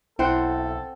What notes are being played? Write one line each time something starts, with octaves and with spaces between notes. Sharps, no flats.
B1 C4 E4 A4 C5 F#5